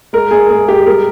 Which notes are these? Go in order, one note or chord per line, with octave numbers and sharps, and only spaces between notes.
G#3 A#4
G#3 G#4
G#3 G#4
G#3 G4
G3 A#4